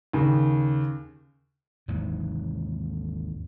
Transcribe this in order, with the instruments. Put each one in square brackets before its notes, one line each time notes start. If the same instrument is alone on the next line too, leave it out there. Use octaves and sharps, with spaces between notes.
[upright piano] D#2 C#3
[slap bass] D#2 G#2 C3 E3